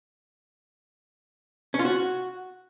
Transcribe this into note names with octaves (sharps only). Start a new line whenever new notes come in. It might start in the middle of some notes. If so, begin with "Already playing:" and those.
C#4
F4
F#4